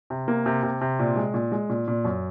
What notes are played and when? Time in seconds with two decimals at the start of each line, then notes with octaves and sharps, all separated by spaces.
0.10 C3
0.28 A#3
0.46 C3
0.63 C3
0.81 C3
0.99 A#2
1.16 G#3
1.34 A#2
1.52 G#3
1.70 A#2
1.88 A#2
2.05 F#2